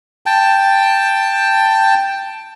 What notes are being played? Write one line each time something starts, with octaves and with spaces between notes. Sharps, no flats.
G5 A5